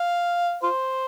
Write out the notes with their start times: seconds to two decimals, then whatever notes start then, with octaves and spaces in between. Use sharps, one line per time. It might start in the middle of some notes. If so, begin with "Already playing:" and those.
Already playing: F5
0.63 F4 C5